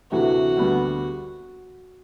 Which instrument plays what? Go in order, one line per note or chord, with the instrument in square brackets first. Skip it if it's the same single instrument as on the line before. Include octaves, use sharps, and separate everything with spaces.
[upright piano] D2 C3 E3 A3 [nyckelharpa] F#4
[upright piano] D2 D3 G3 B3